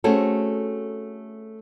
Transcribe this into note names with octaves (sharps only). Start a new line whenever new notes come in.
A3 C4 C#4 F#4 G#4 A4